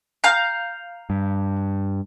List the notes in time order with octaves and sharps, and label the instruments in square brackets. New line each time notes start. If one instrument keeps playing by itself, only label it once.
[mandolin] F5 A#5 G6
[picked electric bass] G2